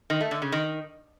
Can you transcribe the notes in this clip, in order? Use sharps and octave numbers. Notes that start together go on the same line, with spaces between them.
D#3
A3
D3
C#3
D#3